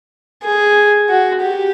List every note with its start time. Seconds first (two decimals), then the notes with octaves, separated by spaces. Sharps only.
0.43 G#4
1.09 F#4
1.42 G4